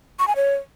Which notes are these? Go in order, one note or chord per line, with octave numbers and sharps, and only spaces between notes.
C#6
G#5
C#5